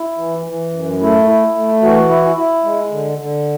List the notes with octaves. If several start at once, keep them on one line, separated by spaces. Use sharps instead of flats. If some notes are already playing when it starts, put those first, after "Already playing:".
Already playing: E4
E3
E3
F#2
A3 E4
E4
A3
E3 F#4
E4
E4
G#3
D3
D3